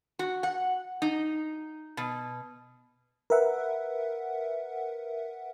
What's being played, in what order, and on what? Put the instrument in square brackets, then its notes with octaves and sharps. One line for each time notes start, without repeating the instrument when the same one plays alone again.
[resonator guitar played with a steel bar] F#4
F#5
D#4
B2
[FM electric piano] A#4 B4 E5 F#5